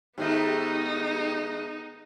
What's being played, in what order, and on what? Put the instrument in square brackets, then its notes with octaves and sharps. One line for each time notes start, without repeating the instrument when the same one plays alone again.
[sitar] G#2 D#3 A3 [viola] B3 D#4 [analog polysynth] G4 G5